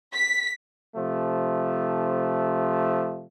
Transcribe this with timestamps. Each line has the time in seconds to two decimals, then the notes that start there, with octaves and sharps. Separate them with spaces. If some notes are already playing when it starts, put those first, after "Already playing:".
0.13 B6
0.94 C3 F3 A3